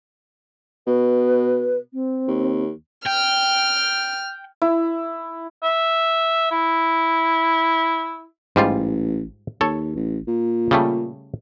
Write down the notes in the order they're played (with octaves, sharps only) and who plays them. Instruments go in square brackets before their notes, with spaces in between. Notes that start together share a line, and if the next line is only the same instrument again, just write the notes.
[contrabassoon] B2 [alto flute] B4
[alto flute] C4
[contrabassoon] D#2
[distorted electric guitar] G5 [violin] F6
[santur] E4
[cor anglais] E5
E4
[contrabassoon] A1 [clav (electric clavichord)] G#2 G3 F4
[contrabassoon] D#2 [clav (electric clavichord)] A4 C#5
[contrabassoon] A1
A#2
[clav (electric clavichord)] C#3 G3 A3